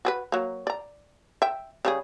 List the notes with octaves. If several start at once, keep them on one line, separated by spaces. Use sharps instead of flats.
F#4 G#4 B4
F#3 A#3
D5 A#5
E5 G5
C#3 G3 G#4